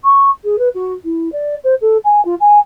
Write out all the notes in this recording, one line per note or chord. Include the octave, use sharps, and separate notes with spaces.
C#6
G#4
B4
F#4
E4
D5
C5
A4
G#5
F4
G#5